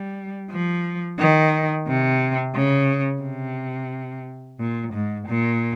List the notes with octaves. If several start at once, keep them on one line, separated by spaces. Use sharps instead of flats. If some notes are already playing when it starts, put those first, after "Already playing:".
Already playing: G3
F3
D#3
C3
C#3
C3
A#2
G#2
A#2